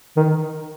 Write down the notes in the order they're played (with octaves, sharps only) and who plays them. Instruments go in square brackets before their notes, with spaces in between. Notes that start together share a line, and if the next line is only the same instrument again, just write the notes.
[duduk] D#3